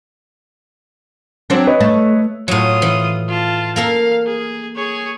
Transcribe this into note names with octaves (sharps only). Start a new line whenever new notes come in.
F#3 C4 D4
B4 C#5 D#5
A3
A2 F#3 F4 D#6
E3
F4 A5
A#3 A4 A#4 F5
G#4
G#4 C#5